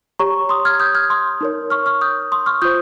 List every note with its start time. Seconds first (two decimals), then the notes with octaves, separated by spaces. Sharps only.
0.19 G4 C#5 A#5 C#6
0.49 C6 D#6
0.65 F6 G#6
0.80 D#6 G6
0.95 F6 G#6
1.10 C6 D#6
1.41 D#4 A#4 C#5
1.70 C#6 F6
1.86 C#6 F6
2.01 D#6 G6
2.32 C6 D#6
2.46 C#6 F6
2.62 F4 C5 D#6 G6